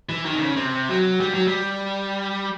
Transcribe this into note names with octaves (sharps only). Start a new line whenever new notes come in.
E3
D#3
C3
C#3
C3
F#3
G3
F#3
G3